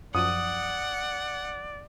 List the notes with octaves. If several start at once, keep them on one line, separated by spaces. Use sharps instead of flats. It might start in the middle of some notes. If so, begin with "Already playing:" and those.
F#2 F3 D5 F#5 D#6 D#7